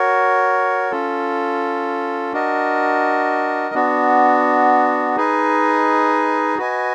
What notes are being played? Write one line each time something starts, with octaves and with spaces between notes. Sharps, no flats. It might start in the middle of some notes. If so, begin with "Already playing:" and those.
Already playing: F#4 A#4 C#5
C#4 F4 A4
D4 F#4 A#4 D#5
B3 D4 F#4
D#4 G#4 B4 D#5
F#4 B4 D#5 G#5